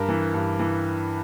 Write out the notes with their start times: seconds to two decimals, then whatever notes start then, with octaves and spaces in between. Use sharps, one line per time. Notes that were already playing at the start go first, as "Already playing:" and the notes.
Already playing: G2 A#4
0.09 E3
0.34 G2
0.59 E3